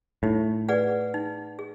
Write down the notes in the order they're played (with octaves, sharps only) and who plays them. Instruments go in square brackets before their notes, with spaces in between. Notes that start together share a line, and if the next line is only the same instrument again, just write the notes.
[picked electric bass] A2 [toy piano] D#4
[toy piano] G#4 B4 D5 F#5
D#4
G#4